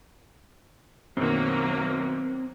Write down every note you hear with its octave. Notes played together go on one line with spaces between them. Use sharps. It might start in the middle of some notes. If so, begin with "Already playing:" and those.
F#2 B2 D#3 F#3 A#3 C4